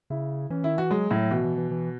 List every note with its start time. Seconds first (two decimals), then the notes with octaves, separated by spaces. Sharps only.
0.10 C#3 E4
0.50 E3 C#4
0.64 D#3 E4
0.77 E3 F#4
0.90 F#3 G#3
1.11 A2 F#3
1.31 B2 E3
1.44 E3
1.58 E3
1.71 E3